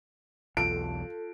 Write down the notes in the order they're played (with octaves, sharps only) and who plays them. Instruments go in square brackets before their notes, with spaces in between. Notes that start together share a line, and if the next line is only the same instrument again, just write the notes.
[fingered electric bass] B1 E2 [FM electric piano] F4 A4 [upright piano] D7